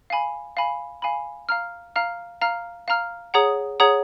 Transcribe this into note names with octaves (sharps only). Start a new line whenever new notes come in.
F5 G#5 B5
F5 G#5 B5
F5 G#5 B5
F5 A#5 F6
F5 A#5 F6
F5 A#5 F6
F5 A#5 F6
G#4 C#5 F#5 A#5 D#6
G#4 C#5 F#5 A#5 D#6